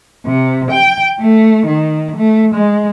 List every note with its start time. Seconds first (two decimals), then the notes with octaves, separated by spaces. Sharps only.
0.26 C3
0.71 G5
1.21 A3
1.67 D#3
2.17 A3
2.55 G#3